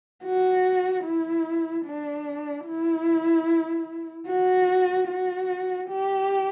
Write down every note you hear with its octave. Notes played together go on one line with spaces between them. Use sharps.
F#4
E4
D4
E4
F#4
F#4
G4